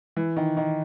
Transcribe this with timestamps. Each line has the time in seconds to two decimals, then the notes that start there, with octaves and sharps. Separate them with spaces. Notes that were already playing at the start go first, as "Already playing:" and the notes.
0.17 E3
0.37 D#3
0.57 D#3